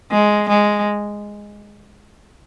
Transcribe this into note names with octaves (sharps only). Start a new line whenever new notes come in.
G#3
G#3